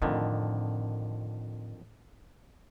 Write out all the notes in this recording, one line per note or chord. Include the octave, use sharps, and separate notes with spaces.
F2 A2 D3 D#3